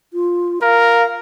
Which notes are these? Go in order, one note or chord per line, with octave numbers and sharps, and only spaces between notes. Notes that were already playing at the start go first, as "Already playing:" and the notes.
F4
A#4 F5